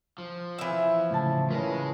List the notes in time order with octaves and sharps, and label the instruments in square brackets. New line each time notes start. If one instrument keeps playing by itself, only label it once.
[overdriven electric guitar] F3
[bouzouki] E3 E5
[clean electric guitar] A2 C#3 [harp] E4 A5
[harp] C#3 C#4 F4 [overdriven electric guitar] G#3 [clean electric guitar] A#4 B4